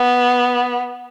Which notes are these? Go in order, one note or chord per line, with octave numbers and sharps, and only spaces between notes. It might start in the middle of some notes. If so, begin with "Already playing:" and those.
Already playing: B3